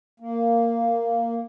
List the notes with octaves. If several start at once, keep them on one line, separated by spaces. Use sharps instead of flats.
A#3